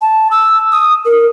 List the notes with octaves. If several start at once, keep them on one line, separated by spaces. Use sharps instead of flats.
A5
E6
D#6
A#4